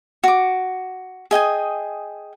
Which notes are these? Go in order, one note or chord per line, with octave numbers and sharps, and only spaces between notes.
F#4 D6
G#4 D#5 G5 G#5